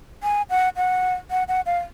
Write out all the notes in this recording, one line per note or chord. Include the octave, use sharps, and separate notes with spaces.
G#5
F#5
F#5
F#5
F#5
F5